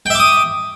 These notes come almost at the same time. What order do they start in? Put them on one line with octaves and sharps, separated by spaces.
G5 E5 D6 D#6